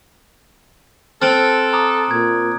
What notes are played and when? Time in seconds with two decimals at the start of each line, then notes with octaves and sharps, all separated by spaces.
1.22 C4 A4 F6 F#6 D7
1.73 A#5 D6 D#6
2.11 A#2 G#6